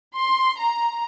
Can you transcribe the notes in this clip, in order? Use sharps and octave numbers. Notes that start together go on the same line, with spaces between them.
C6
A#5